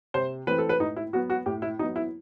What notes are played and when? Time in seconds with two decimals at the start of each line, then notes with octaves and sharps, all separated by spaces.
0.14 C3 C5
0.47 E3 A3 C4 B4
0.58 A4
0.69 B4
0.80 A2 D#4
0.96 E4
1.13 F#3 B3 F#4
1.30 F#4
1.46 A2 G4
1.62 E4
1.79 F#3 D#4
1.82 B3
1.96 E4